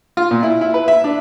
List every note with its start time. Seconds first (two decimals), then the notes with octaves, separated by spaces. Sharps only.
0.17 F4
0.31 A#2
0.43 E4
0.61 E4
0.74 B4
0.88 E5
1.04 D4